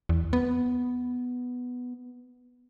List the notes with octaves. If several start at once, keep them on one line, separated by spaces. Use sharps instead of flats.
E2
B3